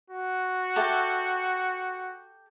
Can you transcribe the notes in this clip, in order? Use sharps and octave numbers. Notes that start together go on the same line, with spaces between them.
F#4
G4 A4 E5